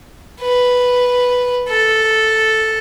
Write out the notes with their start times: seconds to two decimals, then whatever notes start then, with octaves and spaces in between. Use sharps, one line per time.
0.41 B4
1.69 A4